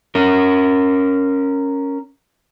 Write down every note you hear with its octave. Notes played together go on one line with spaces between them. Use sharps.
C#4 A#4